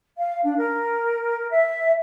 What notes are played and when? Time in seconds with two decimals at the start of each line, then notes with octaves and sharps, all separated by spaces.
0.19 F5
0.44 D4
0.57 A#4
1.52 E5